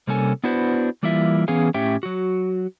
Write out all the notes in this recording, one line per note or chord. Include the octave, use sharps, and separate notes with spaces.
C3 G3 A#3 C#4 A4 G#5
B3 D4 E4 F#4 B4 C5
E3 G3 A#3 E4 F4 E5
E3 B3 C#4 G#4 F5 G#5
A2 C#4 G4 E5 G5
F#3 F#4